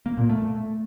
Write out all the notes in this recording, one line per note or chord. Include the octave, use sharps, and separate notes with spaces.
A#3
A#2
A3